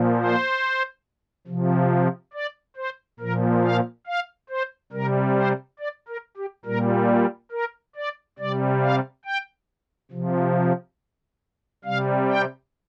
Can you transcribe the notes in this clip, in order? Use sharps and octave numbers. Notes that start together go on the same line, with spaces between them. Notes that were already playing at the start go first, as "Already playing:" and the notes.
Already playing: A#2 F3
C5
C3 F3
D5
C5
A#2 F3 A#4
F5
F5
C5
C3 G3 A#4
C5
D5
A#4
G4
A#2 G3 A#4
A#4
D5
C3 G3 D5
F5
G5
C3 F3
C3 G3 F5
G5